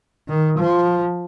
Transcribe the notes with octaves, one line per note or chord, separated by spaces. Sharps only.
D#3
F3